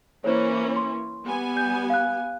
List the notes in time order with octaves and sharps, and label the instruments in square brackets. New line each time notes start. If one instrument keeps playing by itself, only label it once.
[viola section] E3 A#3 C#4 [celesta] C5 C#5
[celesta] C6
[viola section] G3 B3 G#5
[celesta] G6
F5 F#6